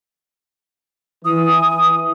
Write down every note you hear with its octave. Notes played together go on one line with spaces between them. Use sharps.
E3 D#6